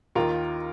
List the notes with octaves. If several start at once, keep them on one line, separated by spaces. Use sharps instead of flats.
D#2 D#3 F4 A#4